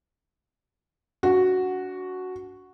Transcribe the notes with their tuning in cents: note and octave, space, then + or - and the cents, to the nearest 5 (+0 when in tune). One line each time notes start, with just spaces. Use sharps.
D4 -35 F#4 +0